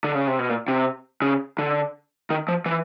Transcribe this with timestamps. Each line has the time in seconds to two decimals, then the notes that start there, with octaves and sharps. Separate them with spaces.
0.04 D3
0.15 C#3
0.27 C3
0.39 B2
0.49 A#2
0.68 C3
1.22 C#3
1.59 D3
2.30 D#3
2.48 F3
2.66 E3